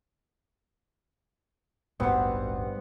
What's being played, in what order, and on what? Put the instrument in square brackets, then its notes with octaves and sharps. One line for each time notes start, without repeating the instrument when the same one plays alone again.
[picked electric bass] D1 G#1 B2 [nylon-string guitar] G2 [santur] B3 C4 F#5